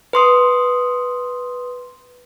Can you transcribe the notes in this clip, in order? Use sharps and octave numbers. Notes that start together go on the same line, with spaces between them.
B4 C6 D#6